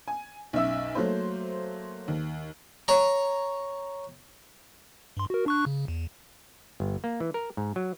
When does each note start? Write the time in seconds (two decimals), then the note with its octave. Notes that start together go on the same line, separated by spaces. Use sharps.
0.08 G#5
0.53 B1 F#2 E5 E6
0.95 F#3 A3 A#3 C5
2.08 D#2
2.88 C#5 A#5
5.17 G2 C6
5.30 F#4 A#4
5.46 D4 C#6 F#6
5.66 C#3
5.88 E2
6.80 G1
7.04 A#3
7.20 E3
7.34 A#4
7.57 G#2
7.76 F#3